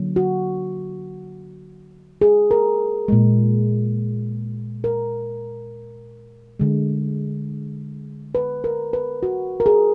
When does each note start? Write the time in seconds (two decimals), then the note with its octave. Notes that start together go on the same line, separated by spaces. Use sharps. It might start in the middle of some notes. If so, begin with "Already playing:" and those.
Already playing: D3 F#3 A#3
0.16 F#4
2.21 G#4
2.51 A#4
3.08 A#2 G#3
4.84 A#4
6.60 D3 G#3
8.35 B4
8.64 A#4
8.93 B4
9.23 F#4
9.60 A#4
9.66 G#4